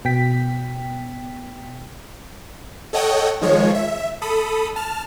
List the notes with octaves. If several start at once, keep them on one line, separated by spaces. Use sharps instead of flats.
B2 G5 B6
A4 C#5 D#5 F#5 G5
D#3 F3 G#3 C#5
E5
A4 B5 D#6
A5 F6